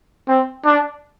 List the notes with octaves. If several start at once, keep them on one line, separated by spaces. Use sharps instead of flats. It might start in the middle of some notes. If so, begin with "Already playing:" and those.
C4
D4